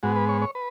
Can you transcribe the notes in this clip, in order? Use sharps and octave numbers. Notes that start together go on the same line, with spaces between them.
G#2 G#3 B3 F#4
B4
C#5
C#5
B4